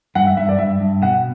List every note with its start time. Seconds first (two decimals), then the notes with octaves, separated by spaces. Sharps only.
0.15 G2 F#5
0.26 E5
0.37 G2 E5
0.49 D5
0.59 G2 E5
0.80 G2
1.02 B2 F#5